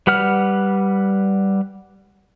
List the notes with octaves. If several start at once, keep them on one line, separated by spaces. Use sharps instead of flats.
G3 B4 F#5 F6